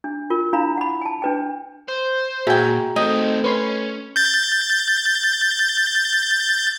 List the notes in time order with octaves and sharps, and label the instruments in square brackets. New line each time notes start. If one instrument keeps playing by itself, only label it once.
[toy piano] D4
F4 A#4
D4 E4 F5 A#5 B5
F#5 B5
G#5 A5
D4 B4 G5
[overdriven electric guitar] C5
[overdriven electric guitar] A#2 [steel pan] F#4 G#4 [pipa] E5 G5 [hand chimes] A#5
[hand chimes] A3 A4 [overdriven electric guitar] C4 D#4 [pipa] D#5 [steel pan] G5
[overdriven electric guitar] C#4 [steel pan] B4 C#5 C6
[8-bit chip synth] G6 A6